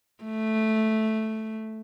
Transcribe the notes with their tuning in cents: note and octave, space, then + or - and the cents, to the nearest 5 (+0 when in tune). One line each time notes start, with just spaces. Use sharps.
A3 -5